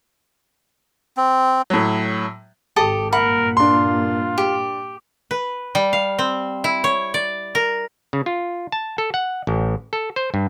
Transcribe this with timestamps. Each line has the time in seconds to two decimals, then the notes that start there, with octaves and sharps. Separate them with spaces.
1.17 C4
1.70 A2 F#3
2.76 G#1 G4 A4 D#6
3.13 G2 A#2 A#3 A#4 F#5 B5
3.57 D4 F4 C6
4.38 G4
5.31 B4
5.75 G3
5.93 F5
6.19 C4
6.64 E4
6.84 C#5
7.14 D5
7.55 A#4
8.13 C#3
8.26 F4
8.72 A5
8.98 A4
9.14 F#5
9.47 A1
9.93 A4
10.16 C5
10.34 G2